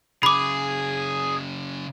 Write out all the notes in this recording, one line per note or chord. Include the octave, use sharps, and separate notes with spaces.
F#2 C#3 G#4 B5 D6